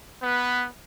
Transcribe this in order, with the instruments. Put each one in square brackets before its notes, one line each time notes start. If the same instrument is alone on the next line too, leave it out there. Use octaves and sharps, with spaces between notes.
[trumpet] B3 [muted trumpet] B4